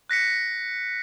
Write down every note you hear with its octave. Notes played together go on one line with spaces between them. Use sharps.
F#6 A#6 B6 C#7